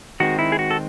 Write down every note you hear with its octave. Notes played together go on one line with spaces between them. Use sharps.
D#3 G#3 C4 F#4
E4
G#4
F#4
A4